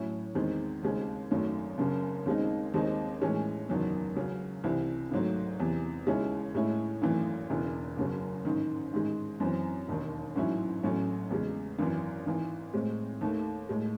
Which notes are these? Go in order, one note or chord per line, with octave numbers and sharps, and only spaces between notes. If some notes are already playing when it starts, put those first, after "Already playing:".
Already playing: A2 F#3 C#4 E4
E2 D#3 G#3 C4
D#2 C#3 G#3 C4
G#1 F#2 D#3 F#3 A3
F#1 F#2 C#3
D#2 C#3 G#3 C4 D#4
D#2 D#3 G#3 C4 D#4
A2 E3 G#3 C#4
F#1 E2 D#3 F#3
C#2 C#3 F#3
C2 C3 E3 C4 E4
G#1 G#2 F#3 A3
E2 C3 E3
D#2 C#3 G#3 C#4 E4
A2 G#3 C#4 E4
G#1 F#2 E3 A3
E1 E2 C#3 E3
F#1 F#2 C#3 F#3
A1 G#2 D#3
A1 G#2 D#3 G#3
F#2 E3 C4
E1 D#2 D#3
A1 G#2 F#3 C#4 E4
A1 A2 F#3 A3 C#4
E2 C#3 G#3
G#1 F#2 E3
G#1 G#2 E3
A2 G#3 C4
D#2 D#3 A3
A2 G#3